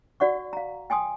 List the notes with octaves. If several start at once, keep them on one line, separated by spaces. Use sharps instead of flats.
F#4 D5 F#5 C#6
F5 A#5
G5 G#5 C6 D#6